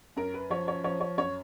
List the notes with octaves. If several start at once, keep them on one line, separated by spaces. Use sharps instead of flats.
F#2 A#4
B4
F3 C#5
C#5
F3 C#5
C#5
F#2 C#5